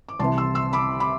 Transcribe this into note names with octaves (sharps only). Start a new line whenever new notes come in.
D6
C2 C3 E3 A5 C6
C6 E6
C6 E6
B5 D6
B5 D6